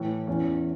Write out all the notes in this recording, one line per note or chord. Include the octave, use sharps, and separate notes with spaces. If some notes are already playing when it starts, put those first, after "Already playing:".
Already playing: A2 E3
E2 E3 C#4